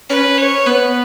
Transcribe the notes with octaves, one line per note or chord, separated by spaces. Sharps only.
C#4 B4
C#5
B3 B4